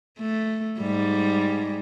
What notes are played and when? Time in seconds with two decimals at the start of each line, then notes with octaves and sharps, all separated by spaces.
0.19 A3
0.79 G#2 G3